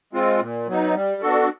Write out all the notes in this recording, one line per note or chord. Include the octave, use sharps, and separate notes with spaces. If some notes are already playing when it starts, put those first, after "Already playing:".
G#3 C4 F4
A#2
F#3 B3 D#4
G3
B3 D4 F#4 A4